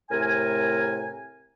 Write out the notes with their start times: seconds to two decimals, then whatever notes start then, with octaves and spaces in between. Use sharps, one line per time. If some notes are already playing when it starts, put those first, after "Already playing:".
0.10 A2 C3 A#4 G#5